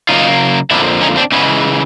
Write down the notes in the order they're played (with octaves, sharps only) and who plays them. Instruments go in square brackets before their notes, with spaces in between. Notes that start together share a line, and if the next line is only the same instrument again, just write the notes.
[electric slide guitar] C#3 F#3 A#3 D#4 F4
F2 D3 F3 A#3 D4 E4
C#4 D#4
C4 D4
C#3 E3 G#3 B3 C#4